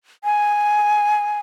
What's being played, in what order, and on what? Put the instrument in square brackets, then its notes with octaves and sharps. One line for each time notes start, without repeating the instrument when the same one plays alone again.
[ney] G#5